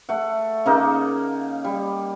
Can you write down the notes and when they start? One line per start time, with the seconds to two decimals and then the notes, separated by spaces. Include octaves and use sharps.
0.09 A3 F#5
0.66 C#3 A#3 D#4
1.64 G3